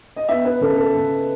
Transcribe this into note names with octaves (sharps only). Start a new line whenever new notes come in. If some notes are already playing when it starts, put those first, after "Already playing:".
D#5
B3 E5
B4
C#3 A4
A4
C#3